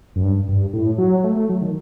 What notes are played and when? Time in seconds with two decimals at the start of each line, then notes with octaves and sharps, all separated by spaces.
0.16 F#2
0.23 G2
0.49 G2
0.73 A2
0.98 F#3
1.24 A3
1.36 A3
1.49 F#3
1.62 D#3